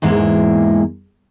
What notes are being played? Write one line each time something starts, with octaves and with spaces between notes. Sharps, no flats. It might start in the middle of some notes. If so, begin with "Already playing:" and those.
E2 G#2 E3 G#3 A#3